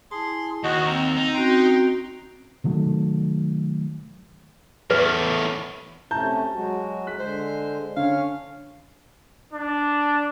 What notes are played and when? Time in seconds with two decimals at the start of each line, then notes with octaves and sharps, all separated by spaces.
0.11 E4 G#4 A5 C6
0.63 D#2 F#4 D#5
0.87 C4 A#5 E6
1.17 D#4
1.34 C4 C#4 F#4 G5 A#5 C6
2.64 C3 D#3 F#3 A3
4.91 E2 A2 B4
6.11 C3 A3 C#4 A5 A#5 G6
6.54 F#3 G#3 F#4
7.07 F#6 B6
7.19 D3 G#3 C5
7.97 D3 C#4 C#5 F5
9.53 D4